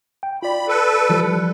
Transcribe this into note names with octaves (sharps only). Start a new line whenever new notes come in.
G5
F4 D5 B5
A4 B4
E3 F3 G3